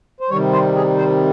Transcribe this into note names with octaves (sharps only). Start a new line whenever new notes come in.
C5
C3 D#3 G3 C#5
C5
G#4
C5